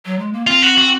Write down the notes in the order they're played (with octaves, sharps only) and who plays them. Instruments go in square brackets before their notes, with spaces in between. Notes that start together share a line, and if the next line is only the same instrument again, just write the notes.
[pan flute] F#3
G#3
A#3
[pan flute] C4 [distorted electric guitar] F4
[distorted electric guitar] F#4
F#4